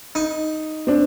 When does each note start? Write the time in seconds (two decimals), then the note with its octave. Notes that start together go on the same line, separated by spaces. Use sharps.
0.15 D#4
0.87 C4 D4